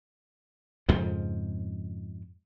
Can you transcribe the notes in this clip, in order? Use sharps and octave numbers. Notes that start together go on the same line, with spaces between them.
F2 G#2 C#3 F3